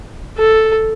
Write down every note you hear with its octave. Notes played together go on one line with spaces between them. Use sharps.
A4